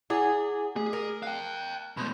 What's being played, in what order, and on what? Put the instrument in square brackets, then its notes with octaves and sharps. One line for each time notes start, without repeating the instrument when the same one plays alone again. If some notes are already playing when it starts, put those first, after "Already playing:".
[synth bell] E4 F#5 D6 [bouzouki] G#4
[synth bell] A3 [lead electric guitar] G#4
[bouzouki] A#4
[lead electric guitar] F5 G5 [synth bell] F#6
[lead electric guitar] B2 A3 [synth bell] B5 C6 G6